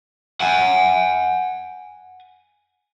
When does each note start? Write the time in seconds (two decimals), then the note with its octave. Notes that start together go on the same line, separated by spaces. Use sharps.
0.40 F#5 G#5